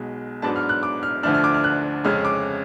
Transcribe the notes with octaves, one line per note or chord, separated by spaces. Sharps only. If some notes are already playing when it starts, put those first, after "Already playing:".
Already playing: B1 B2 G#3
G#2 F#3 B3 D4 A5
F6
F#6
D6
F6
D2 D3 F3 A3 D4 F6
F6
D6
F6
F#6
F2 C#3 G#3 C#4 F6
D6